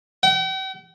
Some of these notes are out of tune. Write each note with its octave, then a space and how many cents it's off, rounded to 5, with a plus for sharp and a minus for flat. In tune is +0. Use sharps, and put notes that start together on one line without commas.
G5 -45